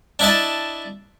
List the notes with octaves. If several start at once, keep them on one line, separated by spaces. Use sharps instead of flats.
D4 E4 D#5 A5